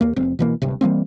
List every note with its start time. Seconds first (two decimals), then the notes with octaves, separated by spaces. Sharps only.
0.01 D#2 A#3
0.16 F1 C4
0.39 B2 E3 A#3
0.62 D1 G1 G2 C3
0.81 E3 G3 A#3 C4